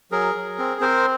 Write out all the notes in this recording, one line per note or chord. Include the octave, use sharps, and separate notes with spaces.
F#3 G#4 A#4
F#3
C4
C4 A#4 C5